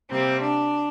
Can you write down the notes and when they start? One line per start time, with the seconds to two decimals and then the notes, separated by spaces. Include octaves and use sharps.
0.10 C3 G3 A#3 C4
0.41 D4